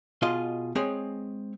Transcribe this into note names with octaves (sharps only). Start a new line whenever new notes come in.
B2 F4 G#4 D#5 C6
G#3 C4 G#4 C#5